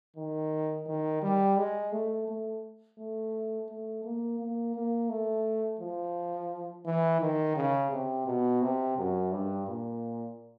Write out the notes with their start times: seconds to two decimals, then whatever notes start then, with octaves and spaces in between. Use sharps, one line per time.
0.16 D#3
0.87 D#3
1.22 G3
1.57 G#3
1.92 A3
2.28 A3
2.98 A3
3.69 A3
4.04 A#3
4.39 A#3
4.75 A#3
5.09 A3
5.80 F3
6.86 E3
7.21 D#3
7.56 C#3
7.91 C3
8.26 B2
8.61 C3
8.97 F#2
9.32 G2
9.67 A#2